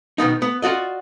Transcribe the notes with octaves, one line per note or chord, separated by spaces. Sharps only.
B2 D#3 B3 D#4
B3
F4 F#4 D5 D#5